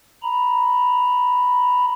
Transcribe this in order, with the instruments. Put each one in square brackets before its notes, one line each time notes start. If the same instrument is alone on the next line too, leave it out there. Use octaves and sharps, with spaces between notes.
[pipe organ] A#5 B5